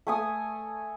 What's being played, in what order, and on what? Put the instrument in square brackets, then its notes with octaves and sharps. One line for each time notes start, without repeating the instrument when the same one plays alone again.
[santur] A3 G#5 D#6